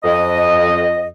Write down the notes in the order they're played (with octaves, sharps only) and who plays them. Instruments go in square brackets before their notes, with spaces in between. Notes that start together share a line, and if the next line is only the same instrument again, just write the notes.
[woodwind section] F2 D#5